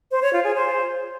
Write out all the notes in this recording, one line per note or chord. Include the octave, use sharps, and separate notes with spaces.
C5
C#5
F4
G#4
C5